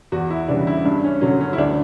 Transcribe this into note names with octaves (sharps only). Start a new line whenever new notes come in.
E2 F#4
E4
C#3 E3 G3 D4
E4
G2 D4
C#4
D3 F#3 C#4
C#4
E4
D2 D4